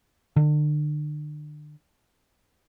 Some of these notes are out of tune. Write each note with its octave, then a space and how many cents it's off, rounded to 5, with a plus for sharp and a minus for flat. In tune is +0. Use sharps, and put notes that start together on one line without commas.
D3 +35